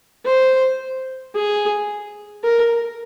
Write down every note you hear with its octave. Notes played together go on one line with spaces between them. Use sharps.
C5
G#4
A#4